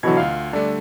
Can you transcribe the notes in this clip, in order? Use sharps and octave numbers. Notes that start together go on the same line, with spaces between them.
B2 D3 E3 F#3 G#6
D2 F4 F5
D3 G3 A3 D4